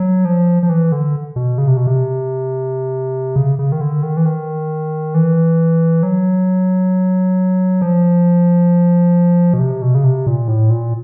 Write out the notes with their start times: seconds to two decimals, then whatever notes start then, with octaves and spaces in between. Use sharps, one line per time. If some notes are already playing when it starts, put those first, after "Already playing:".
Already playing: F#3
0.25 F3
0.63 F3
0.69 E3
0.92 D3
1.36 B2
1.58 C#3
1.68 C3
1.77 B2
1.87 C3
3.36 C#3
3.59 C#3
3.72 D#3
3.81 D3
4.03 D#3
4.17 E3
4.26 D#3
5.14 E3
6.03 F#3
7.81 F3
9.54 B2
9.59 C3
9.82 B2
9.95 C#3
10.04 C3
10.27 A#2
10.48 A2
10.70 A#2